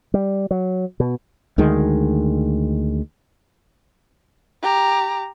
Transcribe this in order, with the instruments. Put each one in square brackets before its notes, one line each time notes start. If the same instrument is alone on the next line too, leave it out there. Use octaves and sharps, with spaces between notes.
[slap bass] G3
F#3
B2
[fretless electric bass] D2 D#3 G#3
[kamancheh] G4 A#5